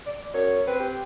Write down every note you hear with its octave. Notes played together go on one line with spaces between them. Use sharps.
D5
F#2 C#5
C4 B4
G4